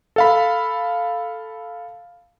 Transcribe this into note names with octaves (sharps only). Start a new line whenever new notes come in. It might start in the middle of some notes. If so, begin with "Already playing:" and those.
A4 F5 B5